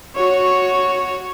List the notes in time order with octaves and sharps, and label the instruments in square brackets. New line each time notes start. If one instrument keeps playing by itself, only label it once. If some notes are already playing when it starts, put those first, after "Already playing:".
[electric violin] F#4 C#5